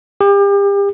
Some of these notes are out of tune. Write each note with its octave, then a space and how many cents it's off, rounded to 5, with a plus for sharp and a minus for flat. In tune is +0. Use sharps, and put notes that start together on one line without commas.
G4 +35